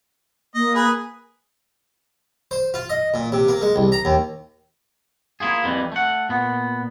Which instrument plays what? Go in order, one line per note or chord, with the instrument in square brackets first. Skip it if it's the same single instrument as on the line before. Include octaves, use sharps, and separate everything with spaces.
[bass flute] A#3 [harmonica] D#5
[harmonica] G#4 B4
[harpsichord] C5
F4
D#5
A#2
C3
A#3
G#3
C2
A#5
D#2
[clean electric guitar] A#3 E4 F4 G#4
F2 E3 G3
A3 F#5
A#2 B3